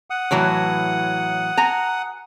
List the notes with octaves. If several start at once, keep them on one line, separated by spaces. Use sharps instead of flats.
F#5 D#6
A2 E3 F#3
G#5 A#5